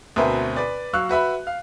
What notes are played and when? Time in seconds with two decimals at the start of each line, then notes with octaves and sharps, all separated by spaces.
0.16 D2 B2 C4 A#4 B4 E5
0.56 B4 D5
0.93 F#3 F5 C#6 E6 F#6
1.09 F#4 B4 E5 B5
1.47 F5